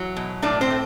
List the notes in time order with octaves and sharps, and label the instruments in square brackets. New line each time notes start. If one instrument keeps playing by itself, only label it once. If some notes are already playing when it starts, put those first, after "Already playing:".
Already playing: [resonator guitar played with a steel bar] E3 F#3
B2
A2 D4 D5
C4 C5
A3